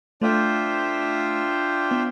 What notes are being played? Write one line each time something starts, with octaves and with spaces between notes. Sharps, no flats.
A3 D4 F4 C5 E5 G5
B3